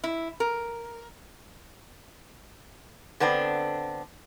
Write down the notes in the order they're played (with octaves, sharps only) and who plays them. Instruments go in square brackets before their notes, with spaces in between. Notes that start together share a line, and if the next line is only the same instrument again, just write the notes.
[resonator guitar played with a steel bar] E4
A#4
D3 B3 C4 D4